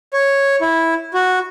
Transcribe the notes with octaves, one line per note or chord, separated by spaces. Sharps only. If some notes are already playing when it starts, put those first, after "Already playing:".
C#5
E4
F#4